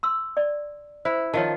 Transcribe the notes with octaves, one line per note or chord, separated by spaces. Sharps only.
C6 E6
D5
E4 C5
D#3 F3 F4 C#5 A5